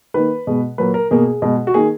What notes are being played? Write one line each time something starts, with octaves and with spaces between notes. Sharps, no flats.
D#3 A#3 B4
B2 G#3
A#2 F#3 A#3 B4
A#4
B2 A#3 G#4
B2 G#3
F#4
D#3 A#3 G#4